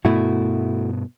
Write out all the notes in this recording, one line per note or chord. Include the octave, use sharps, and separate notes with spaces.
G2 B2 A3 B3 E4 F#4